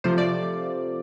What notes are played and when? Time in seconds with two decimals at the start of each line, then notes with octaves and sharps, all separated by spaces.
0.04 C3 F3 A3 C5
0.18 D5